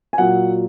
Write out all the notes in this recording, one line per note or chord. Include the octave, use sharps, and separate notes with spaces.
G#5
A#2 F#3 F#5